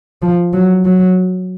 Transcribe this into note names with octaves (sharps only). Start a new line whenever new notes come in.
F3
F#3
F#3